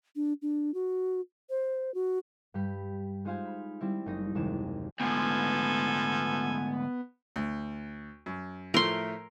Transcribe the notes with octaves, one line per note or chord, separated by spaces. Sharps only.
D4
D4
F#4
C5
F#4
G2 G3 G4 B5
G#3 D#4 F4 C5 F5 G#5
B5
G3 C4 E4
F#1 D#4 A#6
F#1 D#2 C3 G#3 E4 E7
D2 G#2 F3 B3 A4 G#5
D2
F#2
A2 F3 A3 A#4 C6